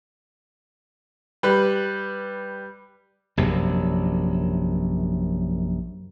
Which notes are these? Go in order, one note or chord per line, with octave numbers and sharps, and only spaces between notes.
G3 B4 B5
A#1 F#2 C3 F#3